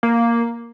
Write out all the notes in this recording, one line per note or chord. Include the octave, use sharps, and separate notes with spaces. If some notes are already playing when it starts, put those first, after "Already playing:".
A#3